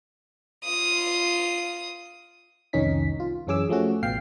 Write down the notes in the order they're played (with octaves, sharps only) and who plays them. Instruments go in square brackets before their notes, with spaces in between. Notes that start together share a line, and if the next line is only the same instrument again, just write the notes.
[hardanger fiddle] F4 D#6
[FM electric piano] C2 F2 D#3 C#4 D#4 B6
F4
F#2 E3 C#4 G#4 D6 E6
F3 A3 C#4 F#4
A1 B2 F5 G5 C7